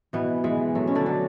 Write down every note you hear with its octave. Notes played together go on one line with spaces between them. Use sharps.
B2 E3 B3
E3 G#3
F#3 A3
C#4
D3 D4
F#3